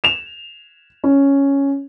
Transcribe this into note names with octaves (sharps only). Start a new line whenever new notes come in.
E7 F7
C#4